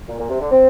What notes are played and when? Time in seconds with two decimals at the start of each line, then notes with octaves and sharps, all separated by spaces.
0.08 A#2
0.19 A#2
0.30 C3
0.40 D3
0.51 C4